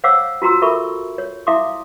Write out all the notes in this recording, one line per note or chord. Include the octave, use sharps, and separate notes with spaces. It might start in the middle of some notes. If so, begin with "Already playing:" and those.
C5 C#5 F5 F#5 D6 E6
F4 F#4 A#5 C6 E6
A4 A#4 E5 B5 C#6
C#5
E4 E5 F5 C6 D6 D#6